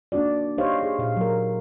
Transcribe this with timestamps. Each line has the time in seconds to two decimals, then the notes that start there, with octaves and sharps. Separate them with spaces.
0.12 A#3 D4 D#4 F#4 D5
0.58 D#4 G4 C5 C#5 D#5 F5
0.83 G#4
0.99 A#2 F5
1.17 F#3 A#4